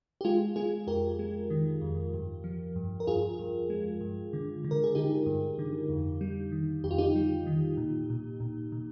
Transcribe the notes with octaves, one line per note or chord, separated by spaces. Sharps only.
G4
G#3 F4 G#4
G#3 F4 G#4
F2 G4 A#4
G#3
D#3
F2
G2
F3
G2
A#4
G2 F4 G#4
G2
G#3
G2
D3
D3
A#4
G#4
D3 D#4 G4
G2
D3
F2
G3
D#3
F2 G4
F4
D#4 G4
G3
D#3
A#2
A#2
A#2
A#2